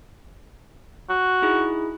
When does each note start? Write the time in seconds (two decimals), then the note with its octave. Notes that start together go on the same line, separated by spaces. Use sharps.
1.10 F#4
1.42 D#4 E4 G#4